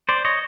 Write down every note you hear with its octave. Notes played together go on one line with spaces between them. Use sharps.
C5 D5
C#5 D#5